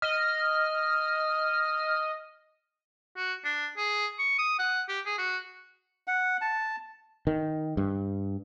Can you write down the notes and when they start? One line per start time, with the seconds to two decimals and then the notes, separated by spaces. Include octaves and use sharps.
0.02 D#5 F6
3.17 F#4
3.44 D4
3.77 G#4
4.19 C#6
4.39 D#6
4.59 F#5
4.89 G4
5.06 G#4
5.18 F#4
6.07 F#5
6.41 A5
7.27 D#3
7.77 G2